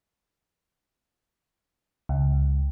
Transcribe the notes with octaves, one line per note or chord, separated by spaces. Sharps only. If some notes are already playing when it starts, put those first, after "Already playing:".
C#2